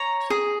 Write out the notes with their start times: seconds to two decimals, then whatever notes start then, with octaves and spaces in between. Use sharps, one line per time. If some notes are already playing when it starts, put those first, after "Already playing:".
Already playing: C#5 A#5
0.30 G#4